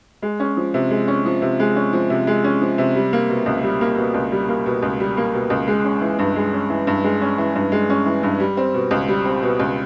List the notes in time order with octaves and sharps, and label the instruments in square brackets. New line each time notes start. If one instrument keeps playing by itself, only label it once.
[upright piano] G#3
C#4
F3
C3
G#3
C#4
F3
C3
G#3
C#4
F3
C3
G#3
C#4
F3
C3
G3
A#3
B2
C#2
G3
A#3
B2
C#2
G3
A#3
B2
C#2
G3
A#3
B2
C#2
G#3
C#4
E3
G2
G#3
C#4
E3
G2
G#3
C#4
E3
G2
G#3
C#4
E3
G2
G3
C4
B2
C#2
G3
C4
B2
C#2